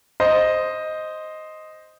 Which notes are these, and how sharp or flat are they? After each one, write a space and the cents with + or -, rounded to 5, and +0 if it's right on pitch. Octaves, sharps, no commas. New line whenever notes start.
C5 +0 D#5 +0